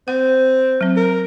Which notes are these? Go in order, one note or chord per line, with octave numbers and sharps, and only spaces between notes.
C4 F#5
F#3 C4
A#4